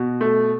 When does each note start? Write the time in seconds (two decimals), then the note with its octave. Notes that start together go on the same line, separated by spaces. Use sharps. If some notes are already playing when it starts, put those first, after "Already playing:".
Already playing: B2
0.21 A3